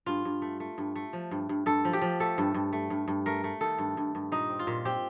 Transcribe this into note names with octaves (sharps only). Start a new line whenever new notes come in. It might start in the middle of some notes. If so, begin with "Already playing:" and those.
G2 F4
G2
A3
A3
G2
A3
F3
G2
G2
G2 A4
F3
G4
F3
A3 A4
G2
G2
A3
G2
G2
A3 A#4
A3
D#3 A4
G2
G2
G2
A#2 D#4
C4
F4
A#2
C4 G4